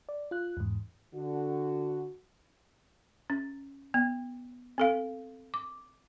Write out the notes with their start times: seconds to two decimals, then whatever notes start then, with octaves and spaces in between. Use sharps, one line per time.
0.09 D5
0.31 F4 F#6
0.57 E2 G#2
1.14 D3 F#4
3.30 C#4
3.94 B3
4.78 C4 A4 F5
5.54 D6